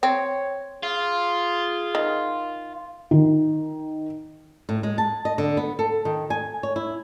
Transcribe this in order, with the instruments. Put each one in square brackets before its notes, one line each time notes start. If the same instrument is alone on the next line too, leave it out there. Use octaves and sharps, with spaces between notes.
[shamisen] C4 [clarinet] C#5
[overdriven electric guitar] F4 [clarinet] G#4
[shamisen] D#3
[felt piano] D#3
[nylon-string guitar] A2
G#3
A5
D#5
D3
B3
A4
D#3
G#5
C#5
E4